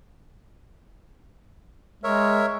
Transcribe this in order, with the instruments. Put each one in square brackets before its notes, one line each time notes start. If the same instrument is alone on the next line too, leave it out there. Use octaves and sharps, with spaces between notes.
[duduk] G#3 [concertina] A#4 C#5 E5